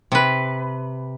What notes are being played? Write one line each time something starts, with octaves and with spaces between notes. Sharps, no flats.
C3 B4